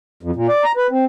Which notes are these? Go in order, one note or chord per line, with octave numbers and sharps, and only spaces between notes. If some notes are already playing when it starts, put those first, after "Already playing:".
F2
A#2
D5
A#5
B4
C4